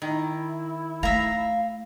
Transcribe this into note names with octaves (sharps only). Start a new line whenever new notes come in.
D#3 E4
A3 E5 F5 A#5